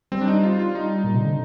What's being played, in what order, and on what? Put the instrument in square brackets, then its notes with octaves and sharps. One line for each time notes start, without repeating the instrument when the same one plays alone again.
[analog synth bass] G3 [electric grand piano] C4
[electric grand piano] D4
D#4
F4
F4
D#4
[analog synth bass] A#2
C3
D3